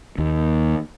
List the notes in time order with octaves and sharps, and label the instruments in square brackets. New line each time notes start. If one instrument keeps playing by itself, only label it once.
[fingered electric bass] D#2